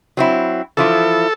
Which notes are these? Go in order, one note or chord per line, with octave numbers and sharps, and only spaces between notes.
F#3 C4 E4
E3 F3 E4 A4